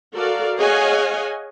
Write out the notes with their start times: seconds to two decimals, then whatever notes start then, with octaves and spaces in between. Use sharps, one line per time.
0.15 F#4 A4 A#4 D5 F5
0.57 G#4 C#5 D#5 F5 F#5 G#5